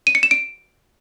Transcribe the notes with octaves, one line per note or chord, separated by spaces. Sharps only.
D#7
C#7
E7
D7